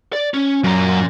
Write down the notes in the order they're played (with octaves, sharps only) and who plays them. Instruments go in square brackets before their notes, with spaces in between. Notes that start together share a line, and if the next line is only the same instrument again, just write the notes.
[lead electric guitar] D5
C#4
[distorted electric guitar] F#2 [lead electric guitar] A#2 A#5